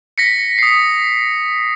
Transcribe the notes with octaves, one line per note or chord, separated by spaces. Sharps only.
A#6 B6 C#7
D#6 C7